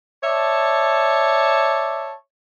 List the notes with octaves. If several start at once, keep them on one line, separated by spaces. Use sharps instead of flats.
C#5 D5 E5 A5